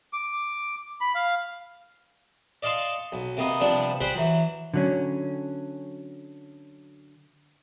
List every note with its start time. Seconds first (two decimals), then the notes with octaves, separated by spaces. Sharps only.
0.13 D6
1.01 B5
1.15 F5
2.63 D5 D#5 F5 A5 C6 C#6
3.12 B1
3.37 C3 A#3 B3 D#5
3.60 C3 F3 G3 B3 D4
4.01 G3 G#4 C5 F#5 G5 B5
4.15 E3 F#3
4.74 D3 F#3 C#4